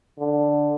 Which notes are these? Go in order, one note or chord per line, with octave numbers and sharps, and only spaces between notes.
D3